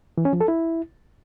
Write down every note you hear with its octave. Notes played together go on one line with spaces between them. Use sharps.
E3
C#4
F3
A4
E4